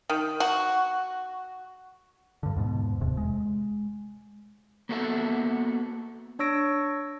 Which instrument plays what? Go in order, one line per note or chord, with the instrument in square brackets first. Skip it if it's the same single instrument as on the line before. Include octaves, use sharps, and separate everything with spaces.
[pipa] D#3
F#4
[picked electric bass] G2 D3
E2 G#2 B2
D1 E2 C3
G#3
[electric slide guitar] A#3 B3 F#4 A4 E5
[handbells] D4 C#5 C#6 E6 A#6 D7